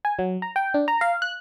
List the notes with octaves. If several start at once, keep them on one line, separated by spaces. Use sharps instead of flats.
G#5
F#3
A#5
G5
D4
A#5
F5
F#6